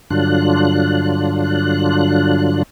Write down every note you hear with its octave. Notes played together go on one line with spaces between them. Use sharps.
G2 D3 F#3 D4 F4 F#6